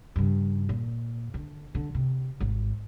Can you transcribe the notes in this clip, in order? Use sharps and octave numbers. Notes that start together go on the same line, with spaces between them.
G2 C#3
A#2
D3
D3
C3
G#1